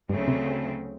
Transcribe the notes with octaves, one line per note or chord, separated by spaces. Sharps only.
D2 G2 C#3 F#3 A3 C4
C3